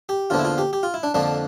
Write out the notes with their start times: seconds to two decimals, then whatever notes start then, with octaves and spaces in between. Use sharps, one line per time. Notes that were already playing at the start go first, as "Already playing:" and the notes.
0.09 G4
0.30 E2 D3 F3 A#3 F4
0.39 E4
0.45 F4
0.58 G4
0.73 G4
0.83 F4
0.94 E4
1.03 D4
1.14 F2 D3 F3 A#3 D4